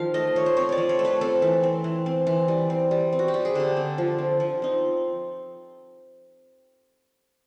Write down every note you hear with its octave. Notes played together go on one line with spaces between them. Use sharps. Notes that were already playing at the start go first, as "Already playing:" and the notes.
Already playing: D#3 F3 F5
A3 D#5
A3 C#5
C5
C4 C#5
C#5 D5
F3
C#5
A3
B4
C4 A4
E3
C4
E3
C4
E3
G3
C4
G3
C4
F#4
G4
G3
G#4
D3 G4
C4
F3
C4
F3
C4 D#4